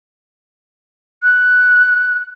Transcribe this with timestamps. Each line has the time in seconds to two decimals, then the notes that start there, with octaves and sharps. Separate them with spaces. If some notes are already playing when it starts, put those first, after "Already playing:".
1.23 F#6